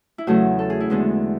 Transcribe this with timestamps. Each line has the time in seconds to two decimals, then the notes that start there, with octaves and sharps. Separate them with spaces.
0.18 E4
0.27 E2 C#3 F#3 A3 F#4
0.59 A4
0.70 G#4
0.80 E4
0.90 E2 D3 G#3 B3